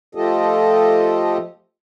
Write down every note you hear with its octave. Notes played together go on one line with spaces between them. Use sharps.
F3 A3 F4 G4 A4 D#5